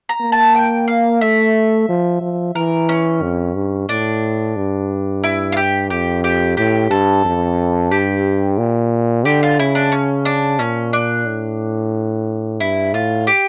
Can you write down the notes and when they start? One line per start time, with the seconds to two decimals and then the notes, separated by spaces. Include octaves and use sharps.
0.09 A#5
0.21 A#3
0.32 A5
0.55 G5
0.88 F5
1.21 A3 E5
1.89 F3
2.21 F3
2.55 E3 A#4
2.89 C#4
3.22 F2
3.55 G2
3.89 A2 D4
4.57 G2
5.24 E4
5.52 F4
5.57 G4
5.90 F2 G4
6.24 G4
6.57 A2 G4
6.90 G2 A4
7.25 F2
7.91 G2 G4
8.58 A#2
9.25 D3 G4
9.43 F4
9.59 C#3 E4
9.75 D4
9.92 C#4
10.25 D4
10.59 A#2 C#4
10.93 D4
11.27 A2
12.60 G2 E4
12.93 A2 F4
13.27 G4